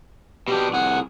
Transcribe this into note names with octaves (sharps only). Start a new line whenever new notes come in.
B2 D4 G4
C2 G#4 F#5